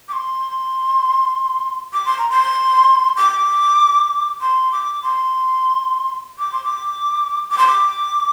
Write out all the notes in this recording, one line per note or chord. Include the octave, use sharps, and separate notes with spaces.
D6
C6
D6
C6
A#5
C6
D6
C6
D6
C6
D6
C6
D6
D6
C6
D6